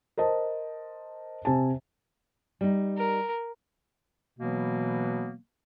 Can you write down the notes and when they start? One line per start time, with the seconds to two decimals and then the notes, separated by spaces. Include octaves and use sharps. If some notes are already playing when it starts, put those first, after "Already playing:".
0.17 A#4 C5 D#5 A5
1.45 C3 G#5 A5
2.61 G3 D#4
2.97 A#4
4.40 B2 E3 F#3 A#3 B3